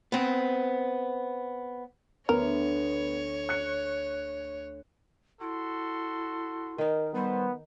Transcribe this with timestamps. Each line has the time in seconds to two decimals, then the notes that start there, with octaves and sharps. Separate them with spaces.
0.12 B3 C4
2.29 D2 B3 A#4 C#5
3.49 F#6 C#7
5.41 E4 F#4 A4 C6
6.78 D#3 D#4 A#4
7.15 G3 B3 A4 C5